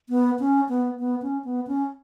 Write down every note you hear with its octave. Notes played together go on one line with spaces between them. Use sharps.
B3
C#4
B3
B3
C#4
B3
C#4